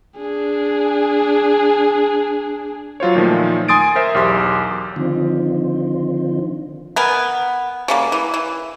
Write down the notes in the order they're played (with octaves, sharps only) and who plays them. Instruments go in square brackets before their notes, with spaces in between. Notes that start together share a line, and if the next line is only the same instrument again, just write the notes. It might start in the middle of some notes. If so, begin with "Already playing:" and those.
[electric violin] D4 G#4
[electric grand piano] F#3 F4 C5 C#5
A#2 D#3 F3 A3
G#5 C6 D#6 A6 D7
A#4 C5 E5
B1 E2 G4 C6
[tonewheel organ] D3 D#3 F3 C4
[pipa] B3 A#4 G#5
C#3 G3 A#3
E3
E3